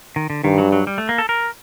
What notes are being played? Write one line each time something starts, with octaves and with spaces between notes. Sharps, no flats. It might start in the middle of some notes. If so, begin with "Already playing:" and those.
D#3
D3
G2 D#3
F#3
F#3
G3
A3
A#3
A4
A#4